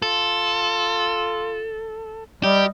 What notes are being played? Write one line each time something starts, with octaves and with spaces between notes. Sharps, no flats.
F4 A4
G3 G4 D#5